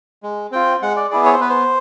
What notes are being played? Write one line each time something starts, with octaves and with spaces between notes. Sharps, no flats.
G#3
C4 F4 G5
G#3 F#5
D5
B3 E4 G#4 D5
C#5
C5
B3 B4
C5